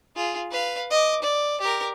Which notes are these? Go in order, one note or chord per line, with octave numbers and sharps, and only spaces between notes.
F4 G#4
B4 F5
D#5 D6
D5
G4 A#4